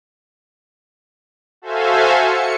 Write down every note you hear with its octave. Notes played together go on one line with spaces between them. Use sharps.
F#4 A4 C5 E5 F5 G#5
C#7